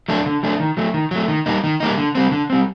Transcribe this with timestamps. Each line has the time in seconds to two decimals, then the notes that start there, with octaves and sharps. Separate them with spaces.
0.08 F#3 A3 D4
0.26 D3
0.43 F#3 A3 D4
0.60 D#3
0.77 F#3 A3
0.94 D#3
1.11 F#3 A3
1.28 D#3
1.46 G3 A#3 D#4
1.64 D#3
1.80 G3 A#3 D#4
1.98 D3
2.15 G3 C4
2.32 D3
2.50 G3 C4